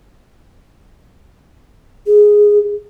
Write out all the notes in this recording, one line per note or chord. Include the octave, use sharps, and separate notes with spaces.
G#4